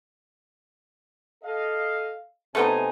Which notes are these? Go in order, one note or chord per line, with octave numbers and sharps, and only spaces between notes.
A4 D#5 F5
C3 A3 B3 D#4 C5 G#5